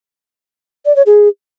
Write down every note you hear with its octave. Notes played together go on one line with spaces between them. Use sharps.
D5
C#5
G#4